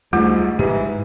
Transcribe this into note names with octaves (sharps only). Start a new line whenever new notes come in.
D2 G#2 G3 A3 F4
G#2 E3 G4